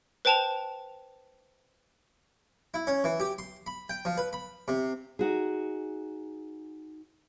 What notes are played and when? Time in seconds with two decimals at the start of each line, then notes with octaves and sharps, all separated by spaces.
0.25 B4 C5 G5 A5 E7 F7
2.74 E4
2.87 C#4
3.04 E3
3.20 G4
3.38 C6
3.67 B5
3.90 G5
4.05 F3
4.18 B4
4.33 B5
4.68 C3
5.19 D#4 F#4 G#4